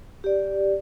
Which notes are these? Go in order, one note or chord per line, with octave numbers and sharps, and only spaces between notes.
G4 D5